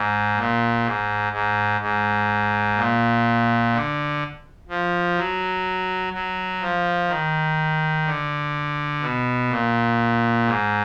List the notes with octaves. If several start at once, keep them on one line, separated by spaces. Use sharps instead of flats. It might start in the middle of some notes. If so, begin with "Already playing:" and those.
Already playing: G#2
A#2
G#2
G#2
G#2
A#2
D3
F3
F#3
F#3
F3
D#3
D3
B2
A#2
G#2